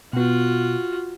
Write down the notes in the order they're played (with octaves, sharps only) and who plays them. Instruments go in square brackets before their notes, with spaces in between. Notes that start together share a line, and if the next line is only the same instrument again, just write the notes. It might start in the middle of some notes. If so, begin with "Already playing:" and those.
[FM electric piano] B2 B3 [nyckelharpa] F4 F#4